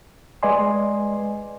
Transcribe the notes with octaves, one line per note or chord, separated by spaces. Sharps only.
G#3 B4 D5 D#5 G#5 C6